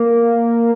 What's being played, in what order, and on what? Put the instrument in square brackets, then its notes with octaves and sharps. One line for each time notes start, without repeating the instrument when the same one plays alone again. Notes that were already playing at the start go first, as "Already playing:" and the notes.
Already playing: [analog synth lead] A#3